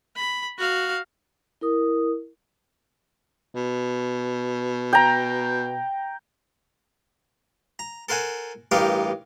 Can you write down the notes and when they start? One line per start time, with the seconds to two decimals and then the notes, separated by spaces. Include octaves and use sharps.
0.16 B5
0.58 F#4 F5
1.61 E4 A#4 D#6
3.55 B2
4.93 G5 A#5
7.79 A#5
8.09 A4 A#4 C5 F#5 G#5
8.71 A1 G2 D#4 G4 A#4 F5